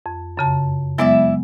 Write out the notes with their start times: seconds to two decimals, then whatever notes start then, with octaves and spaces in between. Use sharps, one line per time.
0.06 F2
0.37 F#2 C#3 A5
0.98 F#3 G#3 B3 E4 D5 E5